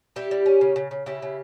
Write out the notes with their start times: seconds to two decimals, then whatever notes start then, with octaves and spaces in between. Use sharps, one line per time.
0.16 G3 E4 G4
0.31 G3
0.46 C#4
0.61 C#3
0.76 C#3
0.91 C#3
1.06 C#3 E4 G4
1.22 C#3